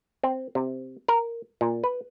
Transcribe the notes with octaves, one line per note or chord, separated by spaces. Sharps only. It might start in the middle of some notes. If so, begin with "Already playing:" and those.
C4
C3
A#4
A#2
B4